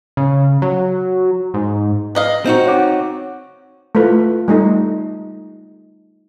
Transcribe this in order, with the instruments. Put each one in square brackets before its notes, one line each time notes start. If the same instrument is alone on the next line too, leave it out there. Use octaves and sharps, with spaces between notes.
[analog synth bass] C#3
F#3
G#2
[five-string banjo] B4 D#5 F5
[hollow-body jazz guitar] C4 D#4 F#4
[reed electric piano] C#5 F#5 D6
[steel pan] A3 E4 F4 B4
G3 A3 D#4